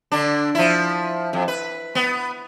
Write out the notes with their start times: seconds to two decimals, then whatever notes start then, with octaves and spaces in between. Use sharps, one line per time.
0.12 D3 D4
0.55 F3 E4
1.33 F2
1.48 B4
1.95 B3